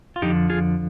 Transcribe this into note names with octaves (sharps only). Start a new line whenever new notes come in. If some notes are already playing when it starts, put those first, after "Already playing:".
F4
F2 D3 F3 D#4 G4
F4 G#4